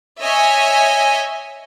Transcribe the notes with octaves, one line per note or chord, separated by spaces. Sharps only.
C#5 D#5 E5 G#5